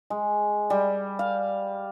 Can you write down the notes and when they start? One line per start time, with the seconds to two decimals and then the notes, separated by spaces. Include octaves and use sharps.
0.10 G#3
0.70 G3
1.19 F5